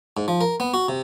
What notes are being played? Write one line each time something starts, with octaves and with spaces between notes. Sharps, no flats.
G#2
F3
A#4
B3
F#4
C3